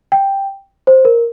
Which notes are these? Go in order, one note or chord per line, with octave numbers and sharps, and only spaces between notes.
G5
C5
A#4